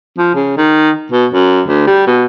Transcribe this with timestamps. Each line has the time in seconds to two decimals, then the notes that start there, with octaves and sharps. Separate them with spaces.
0.18 F3
0.35 C#3
0.58 D#3
1.12 B2
1.33 F#2
1.67 D2
1.87 G3
2.07 B2